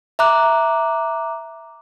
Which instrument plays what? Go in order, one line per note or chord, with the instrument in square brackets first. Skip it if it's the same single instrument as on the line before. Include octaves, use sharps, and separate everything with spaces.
[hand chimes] E5 A#5 D6 F#6